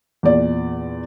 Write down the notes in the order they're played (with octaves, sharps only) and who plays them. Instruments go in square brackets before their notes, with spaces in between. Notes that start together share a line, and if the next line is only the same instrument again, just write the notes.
[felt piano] E2 A#2 D5